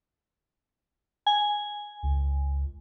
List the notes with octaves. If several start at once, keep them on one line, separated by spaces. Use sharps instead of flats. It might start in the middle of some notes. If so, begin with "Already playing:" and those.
G#5
C#2